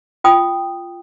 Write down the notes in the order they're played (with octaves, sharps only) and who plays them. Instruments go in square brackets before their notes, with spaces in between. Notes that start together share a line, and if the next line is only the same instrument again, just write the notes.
[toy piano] F4 G5 D#6